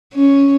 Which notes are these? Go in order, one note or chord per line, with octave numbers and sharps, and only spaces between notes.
C#4